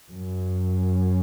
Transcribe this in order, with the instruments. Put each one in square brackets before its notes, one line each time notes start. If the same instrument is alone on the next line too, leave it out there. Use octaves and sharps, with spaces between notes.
[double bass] F#2